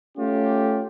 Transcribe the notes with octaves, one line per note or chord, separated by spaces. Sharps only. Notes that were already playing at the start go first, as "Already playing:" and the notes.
A3 C#4 F4 G4